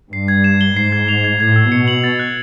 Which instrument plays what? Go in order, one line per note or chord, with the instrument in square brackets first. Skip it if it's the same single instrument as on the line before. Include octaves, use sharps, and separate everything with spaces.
[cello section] G2 [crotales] C7
[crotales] G#6
E7
G7
[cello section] G#2 [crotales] C7
[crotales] G#6
F7
G#6
[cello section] A2 [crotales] G#6
[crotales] E6
[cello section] B2 [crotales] C#7
[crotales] F#7
A6
F#6